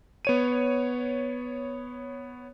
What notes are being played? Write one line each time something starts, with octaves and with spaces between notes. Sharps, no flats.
B3 C#5 D#7